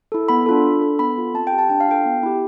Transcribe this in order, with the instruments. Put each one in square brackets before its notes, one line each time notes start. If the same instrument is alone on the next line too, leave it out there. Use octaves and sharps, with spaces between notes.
[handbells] E4 A4
B3 B5
D4 F4 A4
D4
A4
B3 B5
F4 A4
C4 A5
G5
G4
A5
D4 G5
F5
F4 A4 G5
B3
E4 G4